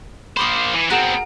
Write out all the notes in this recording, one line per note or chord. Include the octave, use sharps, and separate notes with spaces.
A#3 C5 B5 D6 D#6
E3
B3 C4 F#4 G#4 A#4